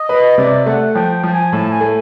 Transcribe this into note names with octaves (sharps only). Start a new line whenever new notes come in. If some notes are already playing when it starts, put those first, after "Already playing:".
Already playing: D#5
B4
C3 D5
A3 F#5
F3 G5
G5
F3 A5
G#5
A2 A5
G#5
A3